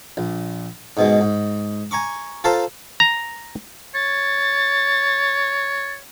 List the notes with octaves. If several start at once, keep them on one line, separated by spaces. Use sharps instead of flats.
A#1
G#2 B2 G#3
G#2
G#5 A#5 C#6 D6
F4 A4 C5 A5 A#5 C6
A#5
C#5 A6